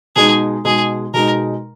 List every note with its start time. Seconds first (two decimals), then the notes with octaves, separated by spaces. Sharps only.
0.16 B2 G#3 D#4 G#4
0.65 B2 G#3 D#4 G#4
1.14 B2 G#3 D#4 A#4